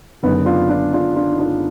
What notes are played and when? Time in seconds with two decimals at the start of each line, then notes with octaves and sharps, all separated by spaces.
0.23 F#1 F#2 D3 B3 D#4
0.46 D4 F4
0.70 D4 F4
0.93 D4 F4
1.16 D4 F4
1.32 D#4
1.39 D4 F4